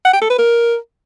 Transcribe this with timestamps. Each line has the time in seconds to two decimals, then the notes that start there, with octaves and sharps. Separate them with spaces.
0.05 F#5
0.13 G5
0.22 A4
0.30 B4
0.38 A#4